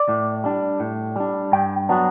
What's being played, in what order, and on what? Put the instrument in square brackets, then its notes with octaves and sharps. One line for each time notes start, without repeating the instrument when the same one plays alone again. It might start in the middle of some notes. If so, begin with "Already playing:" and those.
Already playing: [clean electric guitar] D5
A2
G3 D4
A2
G3 D4
G2 G5
F#3 B3 D4